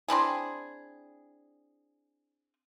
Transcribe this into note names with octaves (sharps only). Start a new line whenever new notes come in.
C4 D4 E4 G#4